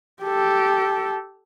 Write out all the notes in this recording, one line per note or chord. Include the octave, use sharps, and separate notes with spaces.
G4 A4